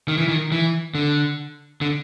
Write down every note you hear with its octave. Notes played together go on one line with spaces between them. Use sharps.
D#3
E3
D#3
E3
D3
D3